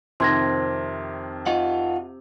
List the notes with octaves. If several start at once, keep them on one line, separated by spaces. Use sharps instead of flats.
F2 C3 D#3 C6 G#6 A#6
F4 D#5 F#5